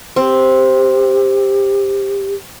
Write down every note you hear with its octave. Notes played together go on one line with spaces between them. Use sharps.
C4 G4